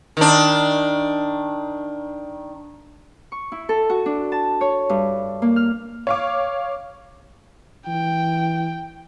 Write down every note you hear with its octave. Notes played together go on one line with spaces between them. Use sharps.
D#3 D4
C#6
E4
A4
F#4
D4
A5
C#5
G2
A#3
F6
C#5 F5 D6
E3 G5